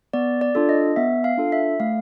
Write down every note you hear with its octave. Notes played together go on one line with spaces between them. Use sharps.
B3 D5
D5
D4 F4 A4
D#5
B3 E5
F5
D4 F4 A4
E5
A3 F5